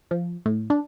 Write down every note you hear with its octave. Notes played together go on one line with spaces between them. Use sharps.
F3
A2
D4